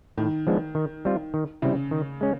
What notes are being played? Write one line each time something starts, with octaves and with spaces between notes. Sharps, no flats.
A2 D#3
F3 G#3 B3 D4
D#3
G3 C4 F4
D#3
C#3 G3 C4 E4
D#3
G#3 C#4